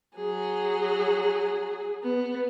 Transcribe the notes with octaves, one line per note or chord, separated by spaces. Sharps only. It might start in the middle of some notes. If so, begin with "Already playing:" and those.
F#3 G#4
B3